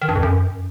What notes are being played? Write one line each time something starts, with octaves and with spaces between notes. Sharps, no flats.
D#3
G2
F2
F#2